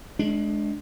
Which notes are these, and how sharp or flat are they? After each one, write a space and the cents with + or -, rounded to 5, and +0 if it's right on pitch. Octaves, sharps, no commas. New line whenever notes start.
G#3 +30 D4 +0